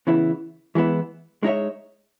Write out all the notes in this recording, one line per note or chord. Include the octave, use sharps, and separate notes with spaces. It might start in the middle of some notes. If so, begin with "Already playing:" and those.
C#3 E3 B3 E4
E3 G#3 B3 E4
G#3 D#4 G#4 C#5 E5